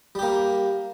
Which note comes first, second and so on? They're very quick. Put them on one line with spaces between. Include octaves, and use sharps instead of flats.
G3 G4 A#3